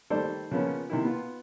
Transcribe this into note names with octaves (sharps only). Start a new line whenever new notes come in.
D#3 G3 A3 A4 C5 D5
C#3 F3 A#3 B3 C#4
C3 D#3 E4
B3 F4